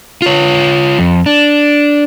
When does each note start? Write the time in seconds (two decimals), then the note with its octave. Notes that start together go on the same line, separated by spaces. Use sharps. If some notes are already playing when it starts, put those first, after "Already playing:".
0.22 F4 C#5
0.99 F2
1.26 D4